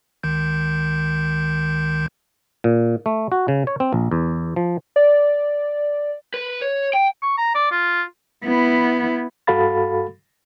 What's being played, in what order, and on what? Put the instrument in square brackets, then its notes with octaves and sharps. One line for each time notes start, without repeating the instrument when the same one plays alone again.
[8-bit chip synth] C#2 D#3 G6
[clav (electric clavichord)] A#2
A3
F#4
C#3
C#5
C4
A#1
E2
F3
[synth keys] D5
[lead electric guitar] B4
C#5
G5
[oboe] C#6
A#5
D5
F4
[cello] B3 E4
[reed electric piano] G2 F#4 A4 F5 B5 A6